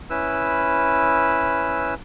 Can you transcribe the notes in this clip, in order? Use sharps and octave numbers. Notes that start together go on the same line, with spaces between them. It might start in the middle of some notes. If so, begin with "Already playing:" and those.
C#4 E4 B4 E6